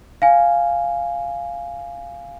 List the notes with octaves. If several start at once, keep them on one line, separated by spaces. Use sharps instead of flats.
F5 G#5